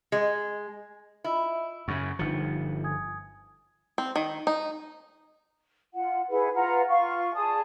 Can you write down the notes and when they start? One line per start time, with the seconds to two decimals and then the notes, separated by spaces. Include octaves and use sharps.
0.12 G#3
1.24 E4 F4 D#5 E6
1.88 F#2 C#3 C#6
2.19 G1 F3 D4 D#4 C#7
2.84 G#5 D#6 G#6
3.98 C4
4.16 D#3
4.47 D#4
5.94 F4 F#5
6.30 E4 G#4 B4 F#5
6.55 F4 B4 F#5 A#5
6.89 F4 F5 C#6
7.34 G#4 D5 A5 D#6